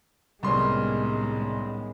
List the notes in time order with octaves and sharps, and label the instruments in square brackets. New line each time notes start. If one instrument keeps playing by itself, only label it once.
[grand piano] C2 C6 [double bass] A2 G#3 [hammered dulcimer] D#3 B3 C#4 [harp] G3